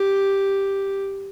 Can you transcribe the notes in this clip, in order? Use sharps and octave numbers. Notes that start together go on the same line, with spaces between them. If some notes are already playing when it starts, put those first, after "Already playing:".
Already playing: G4